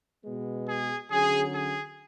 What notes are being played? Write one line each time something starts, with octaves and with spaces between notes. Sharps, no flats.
B2 G#3 B3
G#4
D3 F#3 C#4 G#4
G#4